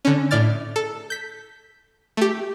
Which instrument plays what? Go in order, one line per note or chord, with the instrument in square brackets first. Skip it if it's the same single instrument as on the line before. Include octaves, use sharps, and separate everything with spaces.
[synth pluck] D3 C#4
A2 D5 F6 A6
A4
G6 B6
A3 G4